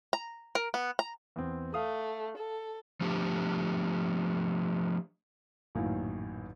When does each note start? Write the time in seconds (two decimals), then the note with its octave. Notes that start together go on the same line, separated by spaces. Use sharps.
0.13 A#5
0.55 A#4
0.74 B3
0.99 A#5
1.36 E2 C4
1.74 A3 F5 D#6
2.38 A4
3.01 F3 A3 D4 G4
5.75 A1 F#2 A#2 D#3 E4 F5